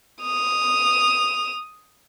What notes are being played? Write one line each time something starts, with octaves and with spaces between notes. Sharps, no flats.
D#6 F7